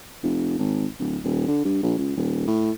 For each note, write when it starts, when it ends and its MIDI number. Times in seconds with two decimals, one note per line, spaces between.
0.23 0.54 29
0.59 0.86 32
0.99 1.18 26
1.24 1.43 27
1.47 1.63 50
1.65 1.80 43
1.83 1.94 34
1.98 2.16 37
2.17 2.47 27
2.47 2.71 45